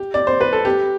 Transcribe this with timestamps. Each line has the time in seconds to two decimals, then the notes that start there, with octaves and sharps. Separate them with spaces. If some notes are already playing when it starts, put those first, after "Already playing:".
Already playing: G4
0.14 D5
0.27 C5
0.41 B4
0.52 A4
0.65 G4